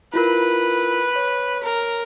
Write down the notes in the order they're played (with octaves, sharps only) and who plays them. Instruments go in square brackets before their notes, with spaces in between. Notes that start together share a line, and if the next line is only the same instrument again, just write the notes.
[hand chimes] E4 F4 A#4 [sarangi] B4
[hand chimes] C#5
[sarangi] A#4